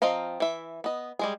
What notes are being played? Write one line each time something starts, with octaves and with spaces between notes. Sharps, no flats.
F3 C4 D#5 F5 A#5
E3 E5
B3 D#5
G3 G#3 G#4